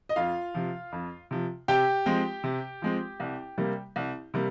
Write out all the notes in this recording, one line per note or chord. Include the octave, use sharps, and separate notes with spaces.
D#5
F2 F4 F5
C3 F3
F2
C3 F3
C3 G4 G5
F3 G#3 C4
C3
F3 G#3 C4
C2
C3 G3 A#3
C2
C3 G3 A#3